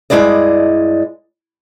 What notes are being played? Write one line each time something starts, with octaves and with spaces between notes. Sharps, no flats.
G2 F#3 G#3 E4 D5 D#5